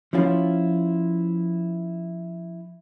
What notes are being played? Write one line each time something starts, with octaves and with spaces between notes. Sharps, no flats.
F3 C#4 E4 F4